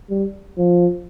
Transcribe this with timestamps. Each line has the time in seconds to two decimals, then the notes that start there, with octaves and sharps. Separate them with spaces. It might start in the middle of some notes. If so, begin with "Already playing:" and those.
0.10 G3
0.58 F3